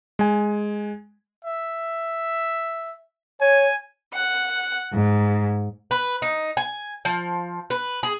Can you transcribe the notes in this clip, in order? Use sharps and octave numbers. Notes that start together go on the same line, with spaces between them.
G#3 G#5
E5
C#5 G#5
F#5
G#2
B4
D#4
G#5
F3
B4
G#4